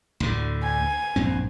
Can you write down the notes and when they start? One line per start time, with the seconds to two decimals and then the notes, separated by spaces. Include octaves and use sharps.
0.20 D2 A2 D3
0.63 G#5
1.16 A#1 G2 C4